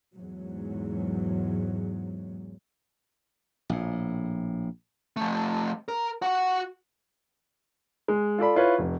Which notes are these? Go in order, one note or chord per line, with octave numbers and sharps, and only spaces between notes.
E2 G#2 F#3
A#1 A2
F3 A3
A#4
F#4 F#5
G#3
F4 A4 D5 B5
E4 F4 B4 C#5
F1